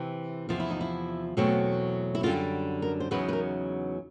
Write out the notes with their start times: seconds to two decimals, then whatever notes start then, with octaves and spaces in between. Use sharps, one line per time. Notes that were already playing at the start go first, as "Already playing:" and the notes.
Already playing: C3 E3 C4
0.49 E2 C3 F3 F4
0.60 E4
0.70 D#4
0.81 E4
1.37 E2 B2 F#3 A3 C4
2.15 E4
2.23 F#2 D3 G3 F4
2.82 A#4
3.00 C5
3.11 E2 C#3 F#3 B3 D#4 B4
3.28 B4
3.33 A#4